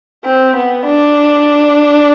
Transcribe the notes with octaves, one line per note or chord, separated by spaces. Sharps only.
C4
B3
D4